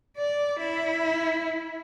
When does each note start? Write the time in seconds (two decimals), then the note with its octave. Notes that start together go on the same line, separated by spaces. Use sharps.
0.18 D5
0.61 E4